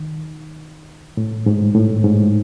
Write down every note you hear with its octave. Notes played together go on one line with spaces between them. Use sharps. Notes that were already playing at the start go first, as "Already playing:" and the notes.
Already playing: D#3
A2
G#2
A2
G#2